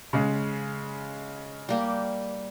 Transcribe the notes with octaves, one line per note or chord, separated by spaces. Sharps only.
C#3 G#3
G3 A#3 G4